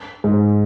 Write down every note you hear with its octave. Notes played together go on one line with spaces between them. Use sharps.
G#2